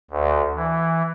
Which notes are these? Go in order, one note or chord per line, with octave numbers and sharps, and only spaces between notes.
D2
E3